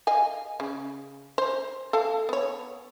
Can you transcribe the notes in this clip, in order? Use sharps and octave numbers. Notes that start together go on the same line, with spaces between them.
D#5 F5 G#5
C#3
C5
A4 F5 A5
B3 C#5